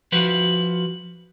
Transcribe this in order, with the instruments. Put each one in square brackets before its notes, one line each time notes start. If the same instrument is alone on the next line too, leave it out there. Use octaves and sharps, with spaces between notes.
[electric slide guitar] F3 F#4 B4